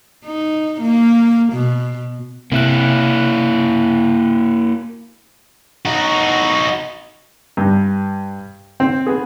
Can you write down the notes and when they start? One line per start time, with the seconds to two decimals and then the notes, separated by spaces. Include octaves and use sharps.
0.25 D#4
0.81 A#3
1.53 B2
2.52 C3 A#3 E4 F#6
5.85 D#4 F#4
7.57 G2
8.80 C4
9.07 B3 G#4